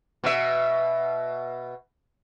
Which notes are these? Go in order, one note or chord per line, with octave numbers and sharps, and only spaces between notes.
B2 E5